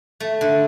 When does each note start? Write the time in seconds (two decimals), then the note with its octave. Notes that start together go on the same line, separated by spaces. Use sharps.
0.20 A3
0.41 D3